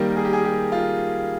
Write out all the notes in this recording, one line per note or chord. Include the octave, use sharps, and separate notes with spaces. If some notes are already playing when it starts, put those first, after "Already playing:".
Already playing: D#3 G3 A#3
G#4
G4
G#4
G4
F4